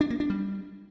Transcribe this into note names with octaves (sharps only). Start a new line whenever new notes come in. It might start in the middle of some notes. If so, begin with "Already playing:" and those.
D4
A#3
D4
G3